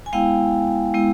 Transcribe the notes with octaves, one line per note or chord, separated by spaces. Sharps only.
G#5
G#3 B3 E4 F5 G5
G#3 B3 E4